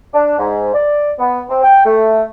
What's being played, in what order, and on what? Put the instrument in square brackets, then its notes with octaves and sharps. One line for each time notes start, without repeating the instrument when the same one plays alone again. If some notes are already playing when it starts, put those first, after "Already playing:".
[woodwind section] D4
G#2
D5
B3
C4
G5
A3